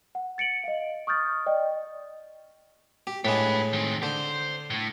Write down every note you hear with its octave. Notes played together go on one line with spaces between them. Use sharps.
F#5
A6 C#7 D7 F#7
D#5 F5
C#6 D#6 F6 G6 A6
D5 D#5 G5
G4
A2 G#3 G4 B4
D#3 C4
D3 C5
A2